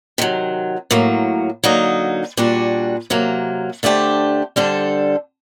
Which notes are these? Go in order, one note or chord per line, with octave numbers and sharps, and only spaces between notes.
C3 D#3 F#3
A2 F#3 A#3
D3 F#3 A#3 D#4
A#2 G3 D4 F#4
C3 F#3 A#3
D3 A3 D4 G4 C5
D3 G3 D4 A4 C5